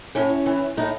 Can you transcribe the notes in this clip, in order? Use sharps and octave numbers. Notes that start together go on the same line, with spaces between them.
A2 C#4
E3
A2 D#4